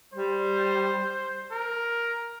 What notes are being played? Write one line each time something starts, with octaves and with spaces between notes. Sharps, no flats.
G3 C5
A#4